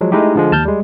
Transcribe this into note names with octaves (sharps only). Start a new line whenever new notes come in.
F3 F#3 G#3
G#3 A3 D#4 E4 G4
D3 F3 G#3
D#2 A5 F6 G6
G3 G#3